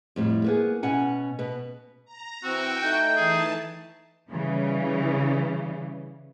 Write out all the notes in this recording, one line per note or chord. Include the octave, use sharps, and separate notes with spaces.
F2 A2 G3
A#3 B3 G#4
B2 C#4 F#5 G#5
B2 B4
A#5
E3 C4 F#4 G5 E6
A3 D#4 G6
E3 G#4 A5
C#3 E3 G3